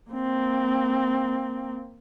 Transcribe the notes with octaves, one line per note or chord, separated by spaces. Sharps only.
A#3 C4